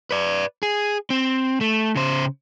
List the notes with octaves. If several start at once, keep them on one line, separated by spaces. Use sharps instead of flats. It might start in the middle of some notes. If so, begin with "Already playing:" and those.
B4 D5
G#4
C4
A3
C#3 C5